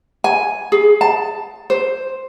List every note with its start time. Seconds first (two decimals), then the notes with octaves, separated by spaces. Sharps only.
0.24 G#5
0.72 G#4
1.01 A5
1.70 C5